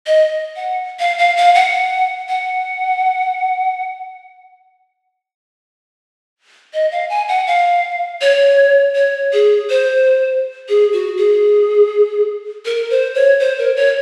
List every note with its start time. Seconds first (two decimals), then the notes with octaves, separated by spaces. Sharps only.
0.06 D#5
0.56 F#5
0.99 F5
1.18 F5
1.37 F5
1.55 F#5
2.29 F#5
6.74 D#5
6.92 F5
7.10 G#5
7.28 F#5
7.47 F5
8.21 C#5
8.95 C#5
9.33 G#4
9.70 C5
10.69 G#4
10.93 F#4
11.17 G#4
12.65 A#4
12.90 C5
13.15 C#5
13.40 C5
13.58 A#4
13.76 C#5